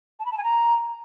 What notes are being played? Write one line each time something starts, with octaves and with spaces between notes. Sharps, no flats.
A5
B5
A5
G#5
A#5